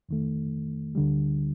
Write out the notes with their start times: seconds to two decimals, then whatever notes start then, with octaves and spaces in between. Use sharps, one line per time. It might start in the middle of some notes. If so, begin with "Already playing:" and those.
0.09 F2 D#3 A3
0.95 D2 D3 G3